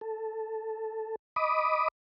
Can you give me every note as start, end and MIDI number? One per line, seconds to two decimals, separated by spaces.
0.01 1.16 69
1.36 1.88 75
1.36 1.88 83
1.36 1.88 86
1.36 1.88 87